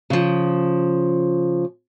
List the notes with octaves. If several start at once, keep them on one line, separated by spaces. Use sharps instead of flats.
C#3 F3